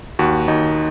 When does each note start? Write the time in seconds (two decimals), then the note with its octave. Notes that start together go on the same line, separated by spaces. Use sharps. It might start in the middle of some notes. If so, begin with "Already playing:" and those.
0.19 D#2 F#4
0.48 D#2 D#4